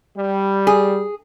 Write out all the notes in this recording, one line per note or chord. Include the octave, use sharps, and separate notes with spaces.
G3
G#4